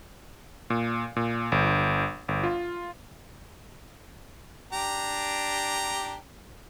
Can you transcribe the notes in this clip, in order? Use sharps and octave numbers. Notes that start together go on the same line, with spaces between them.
A#2
A#2
G1
G1
F4
D4 G4 A#5